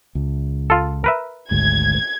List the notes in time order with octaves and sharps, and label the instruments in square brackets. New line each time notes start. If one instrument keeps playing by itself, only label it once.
[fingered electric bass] C#2
[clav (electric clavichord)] F4 A4
A#4 B4 E5
[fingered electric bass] G#1 D2 G#2 [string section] G#6